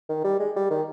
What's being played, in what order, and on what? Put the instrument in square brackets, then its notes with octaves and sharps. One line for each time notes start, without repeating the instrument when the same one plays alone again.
[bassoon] D#3
G3
G#3
G3
D#3